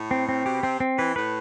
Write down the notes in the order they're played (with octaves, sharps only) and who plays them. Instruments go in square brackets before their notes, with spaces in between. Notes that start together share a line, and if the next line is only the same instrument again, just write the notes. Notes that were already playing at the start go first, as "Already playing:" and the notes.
Already playing: [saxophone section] A2
[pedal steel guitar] C4
C4
[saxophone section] B2 [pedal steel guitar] G4
[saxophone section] C3 [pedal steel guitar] C4
[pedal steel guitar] C4
[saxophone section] E3 [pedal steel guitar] B4
[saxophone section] A2 [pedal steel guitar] B4